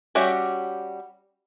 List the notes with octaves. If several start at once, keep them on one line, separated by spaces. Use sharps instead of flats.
G3 C#4 F#4 G4 E5